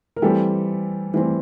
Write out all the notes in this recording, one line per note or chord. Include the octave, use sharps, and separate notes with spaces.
A#4
E3 G3 C4 G4 A4
E3 G3 C4